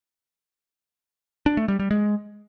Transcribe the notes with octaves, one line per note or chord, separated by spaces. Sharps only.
D4
A3
G3
G3
G#3